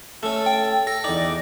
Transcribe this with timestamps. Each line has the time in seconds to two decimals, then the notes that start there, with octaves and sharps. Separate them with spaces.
0.23 A3 C#4 A4
0.46 G5
0.87 A4 A#6
1.04 E2 D#4 D5